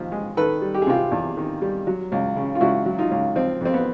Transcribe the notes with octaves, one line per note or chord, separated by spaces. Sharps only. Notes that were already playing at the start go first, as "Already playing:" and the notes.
Already playing: D#2 F3
G#3
D#3 A4 B4
G3
G4
G#4
C3 F4 G4
E2
D#3
G3
F#3
C#2
C#3
F4
C#2 E4 F#4
F#3
D#4 F4
C#2
F3 C4
F2 C4
B3